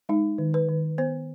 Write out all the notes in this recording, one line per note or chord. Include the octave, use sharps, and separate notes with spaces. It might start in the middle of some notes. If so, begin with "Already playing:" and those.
G#3 D#4
D#3
B4
D#3
B3 C5